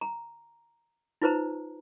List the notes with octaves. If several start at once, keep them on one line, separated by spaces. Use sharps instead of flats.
A#5
D#4 F4 B4 C5 A#5